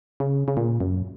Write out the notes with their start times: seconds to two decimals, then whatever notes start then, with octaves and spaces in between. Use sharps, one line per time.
0.20 C#3
0.48 C#3
0.57 A#2
0.80 F#2